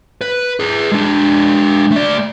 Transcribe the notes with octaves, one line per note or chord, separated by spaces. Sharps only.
B4
G#4 B4
G#3 D4
A3 D5